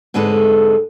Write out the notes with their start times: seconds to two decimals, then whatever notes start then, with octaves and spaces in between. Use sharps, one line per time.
0.14 G#2 D3 G#3 C4 A4 B4